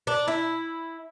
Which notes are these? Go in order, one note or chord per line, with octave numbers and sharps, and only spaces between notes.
D4
E4